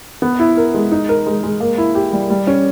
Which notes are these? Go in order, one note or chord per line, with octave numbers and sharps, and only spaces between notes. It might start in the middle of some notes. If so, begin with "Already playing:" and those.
B3
E4
A#4
G#3
D#4
A#4
G#3
G#3
A#3
E4
G4
G3
G3
C#4